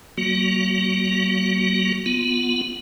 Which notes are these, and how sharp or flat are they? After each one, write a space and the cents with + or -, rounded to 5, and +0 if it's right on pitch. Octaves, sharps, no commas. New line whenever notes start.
F#3 +40 A#3 +0 F#4 +0
B3 +0 F4 +0